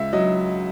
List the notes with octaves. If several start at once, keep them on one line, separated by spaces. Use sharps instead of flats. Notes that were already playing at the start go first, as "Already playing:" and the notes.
Already playing: C#2 E5
F#3 D#5